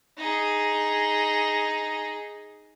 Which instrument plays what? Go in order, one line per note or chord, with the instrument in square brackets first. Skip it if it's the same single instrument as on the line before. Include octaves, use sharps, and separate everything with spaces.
[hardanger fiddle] D#4 G#4